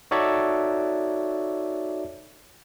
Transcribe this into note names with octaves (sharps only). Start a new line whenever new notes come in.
D#4 F#4 A4 C#5 D5 E5